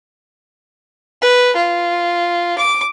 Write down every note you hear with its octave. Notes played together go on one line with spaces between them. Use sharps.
B4
F4
D6